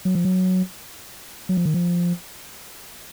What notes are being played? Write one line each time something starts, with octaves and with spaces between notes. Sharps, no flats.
F#3
F3
F#3
F#3
F3
D#3
F3